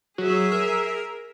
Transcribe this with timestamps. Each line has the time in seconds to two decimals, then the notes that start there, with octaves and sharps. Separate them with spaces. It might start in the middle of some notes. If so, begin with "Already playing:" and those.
0.18 F#3 G#4 E5
0.52 A#4